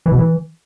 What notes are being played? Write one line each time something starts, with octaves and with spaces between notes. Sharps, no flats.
E3
B2
E3